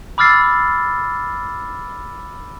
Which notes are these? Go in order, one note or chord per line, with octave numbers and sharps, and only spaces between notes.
B5 D6 E6 F6 A6 C7